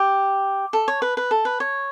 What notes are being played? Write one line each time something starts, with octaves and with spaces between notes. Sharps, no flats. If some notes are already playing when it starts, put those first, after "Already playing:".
Already playing: G4
A4
C#5
B4
B4
A4
B4
C#5